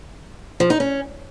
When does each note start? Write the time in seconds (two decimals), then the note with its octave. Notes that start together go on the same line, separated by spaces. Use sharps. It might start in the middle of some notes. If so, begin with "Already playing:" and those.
0.60 F3
0.70 D#4
0.80 C#4